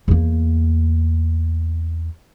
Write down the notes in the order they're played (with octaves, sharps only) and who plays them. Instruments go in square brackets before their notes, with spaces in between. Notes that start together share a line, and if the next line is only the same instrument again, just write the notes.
[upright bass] E2 A#3